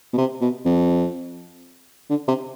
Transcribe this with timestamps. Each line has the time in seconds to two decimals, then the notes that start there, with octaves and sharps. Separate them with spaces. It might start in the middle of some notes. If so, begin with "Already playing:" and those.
0.13 B2
0.18 C3
0.41 B2
0.65 F2
2.10 D3
2.28 C3